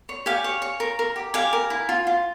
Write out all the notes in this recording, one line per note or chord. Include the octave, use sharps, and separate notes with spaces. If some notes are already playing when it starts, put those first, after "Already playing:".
C#5
G4 F5 G#5
C#5
C#5
A#4
A#4
G4
G4 F5 G#5
A#4
E4
F4
F4